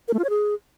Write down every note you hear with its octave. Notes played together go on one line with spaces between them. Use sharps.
A#4
A3
F4
C#5
G#4